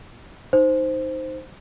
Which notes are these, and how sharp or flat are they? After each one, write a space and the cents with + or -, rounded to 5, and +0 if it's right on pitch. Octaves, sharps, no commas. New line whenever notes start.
D#4 +0 C5 +0